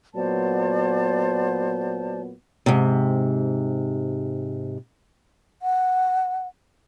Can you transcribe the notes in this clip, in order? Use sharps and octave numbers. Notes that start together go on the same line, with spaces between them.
A#2 F#3 B3 C5 D5 A5
G#2 C3
F#5